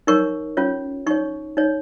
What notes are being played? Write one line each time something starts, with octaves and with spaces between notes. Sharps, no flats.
D#4 A#4 C#5 C#6
C#4 F4 C#5
D#4 C#5 C#6
D#4 C#5